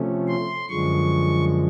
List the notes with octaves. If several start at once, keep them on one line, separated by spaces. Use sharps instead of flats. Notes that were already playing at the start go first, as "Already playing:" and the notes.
Already playing: C3 F3 A3 C#4
C6
F#2 D3 F3 G#3 C#6